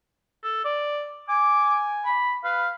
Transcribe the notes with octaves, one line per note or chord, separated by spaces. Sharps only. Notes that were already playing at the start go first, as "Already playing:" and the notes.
A4
D5
G#5 D6
B5
B4 F5